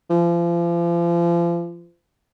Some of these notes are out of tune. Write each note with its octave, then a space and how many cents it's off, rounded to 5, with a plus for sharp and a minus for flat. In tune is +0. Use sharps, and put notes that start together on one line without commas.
F3 -35